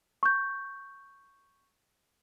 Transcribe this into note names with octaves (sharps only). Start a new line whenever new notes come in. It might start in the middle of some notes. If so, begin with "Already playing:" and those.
C#6 G6